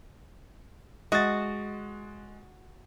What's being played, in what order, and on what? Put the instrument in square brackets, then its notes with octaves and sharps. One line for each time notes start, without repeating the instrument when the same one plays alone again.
[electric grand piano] G#3 A6 [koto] F#4 [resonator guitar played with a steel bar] D#5